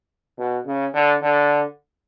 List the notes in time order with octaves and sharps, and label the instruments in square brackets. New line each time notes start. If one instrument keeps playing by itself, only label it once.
[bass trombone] B2
C#3
D3
D3